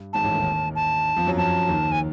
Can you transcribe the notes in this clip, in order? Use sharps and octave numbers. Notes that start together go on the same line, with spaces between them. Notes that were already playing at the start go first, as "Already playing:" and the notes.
Already playing: G2
G#1 G#2 A5
A1 A2
D#2 D#3
A5
F2 F3
F#2 F#3
F2 F3 A5
D#2 D#3
G#5